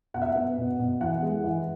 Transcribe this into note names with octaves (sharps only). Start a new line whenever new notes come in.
B2 F#5
E5
F#5
B3
B2
B2
E3 F#5
G#3
E3